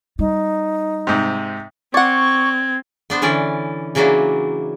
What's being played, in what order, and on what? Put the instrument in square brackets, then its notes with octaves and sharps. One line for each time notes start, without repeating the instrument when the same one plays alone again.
[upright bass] G3 [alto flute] D#4
[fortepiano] G#2 C3
[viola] C4 [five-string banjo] D5 F#5 [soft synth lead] C#6 [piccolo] G#6
[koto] B3 D4 C5
D3 E3 C#4 D5
C#3 E3 F#3 A#3 D4